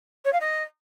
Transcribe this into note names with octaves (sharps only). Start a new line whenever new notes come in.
C#5
F5
D#5